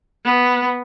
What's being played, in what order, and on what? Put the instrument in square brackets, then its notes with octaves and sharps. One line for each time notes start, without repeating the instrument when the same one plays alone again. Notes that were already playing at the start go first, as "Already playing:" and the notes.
[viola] B3